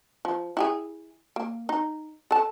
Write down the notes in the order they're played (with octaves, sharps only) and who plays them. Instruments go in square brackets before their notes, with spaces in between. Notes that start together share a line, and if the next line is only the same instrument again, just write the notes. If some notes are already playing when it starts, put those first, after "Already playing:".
[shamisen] F3
E4 G4 G#4
A#3
D#4
A4 A5